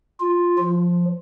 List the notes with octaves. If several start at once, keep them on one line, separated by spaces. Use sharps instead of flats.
F4
F3